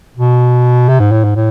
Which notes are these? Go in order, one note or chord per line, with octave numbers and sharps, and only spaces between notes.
B2
C3
G#2
A2
G#2
A2